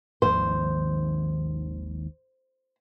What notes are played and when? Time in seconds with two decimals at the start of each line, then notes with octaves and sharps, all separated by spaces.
0.22 G#1 D#2 F3 C5